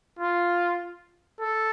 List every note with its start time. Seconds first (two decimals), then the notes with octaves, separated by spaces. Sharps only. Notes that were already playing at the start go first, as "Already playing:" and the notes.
0.19 F4
1.40 A4